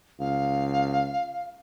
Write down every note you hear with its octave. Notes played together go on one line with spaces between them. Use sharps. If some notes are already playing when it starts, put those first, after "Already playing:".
C#2 F5